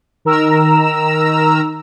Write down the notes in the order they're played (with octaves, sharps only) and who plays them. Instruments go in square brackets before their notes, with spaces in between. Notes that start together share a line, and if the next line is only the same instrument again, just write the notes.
[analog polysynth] D#3 A#4 A#5 E6